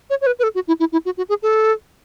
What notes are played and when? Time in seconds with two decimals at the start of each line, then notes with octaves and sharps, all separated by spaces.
0.10 C#5
0.21 C#5
0.26 B4
0.39 B4
0.43 A4
0.55 F#4
0.68 E4
0.80 E4
0.92 E4
1.05 F#4
1.17 F#4
1.29 G#4
1.43 A4